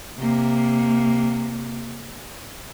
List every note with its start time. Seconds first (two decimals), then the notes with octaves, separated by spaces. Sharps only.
0.19 C3 A#3